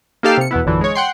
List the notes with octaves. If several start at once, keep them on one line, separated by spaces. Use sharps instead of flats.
A#3 D#4 G4 A4 F5
C3 C#7
E2 B2 B3 E4
A#1 F#2 D3 E3
G#3 C#5
F#5 G5 C6